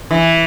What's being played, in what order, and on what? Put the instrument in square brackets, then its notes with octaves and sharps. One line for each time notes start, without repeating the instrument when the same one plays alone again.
[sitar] E3